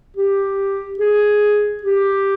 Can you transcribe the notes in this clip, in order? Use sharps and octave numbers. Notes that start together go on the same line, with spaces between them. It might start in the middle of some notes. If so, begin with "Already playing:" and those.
G4
G#4
G4